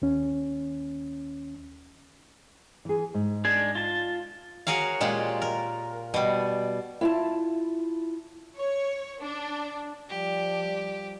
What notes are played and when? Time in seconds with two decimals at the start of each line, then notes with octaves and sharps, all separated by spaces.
0.02 D#2 C#4
2.85 E3 G#4
3.14 G#2
3.45 G#3 D4 G#4
3.75 F4 A5
4.67 F#4 G#4 A#4 C#5 F5
5.01 A#2 G#3 F4 G4
5.42 A#4
6.14 B2 G3
7.01 E4 F4 A5
8.56 C#5
9.22 D4
10.09 F3 G3 G4 D5